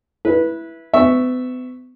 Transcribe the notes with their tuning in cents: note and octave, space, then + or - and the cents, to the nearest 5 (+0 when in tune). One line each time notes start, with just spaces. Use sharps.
E4 +0 B4 -15
B3 +40 E5 +0 C#6 +0